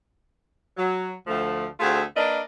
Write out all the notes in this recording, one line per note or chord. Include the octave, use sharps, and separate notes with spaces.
F#3
D2 F3 A3
D2 A3 C4 F4 G#4
A#3 D4 A#4 B4 D5 D#5